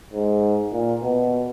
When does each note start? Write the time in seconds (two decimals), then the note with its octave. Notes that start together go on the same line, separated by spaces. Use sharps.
0.13 G#2
0.73 A#2
1.03 B2